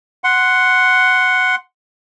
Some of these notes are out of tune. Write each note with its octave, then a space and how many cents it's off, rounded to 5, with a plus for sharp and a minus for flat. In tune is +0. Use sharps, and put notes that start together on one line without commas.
F#5 +0 C6 +0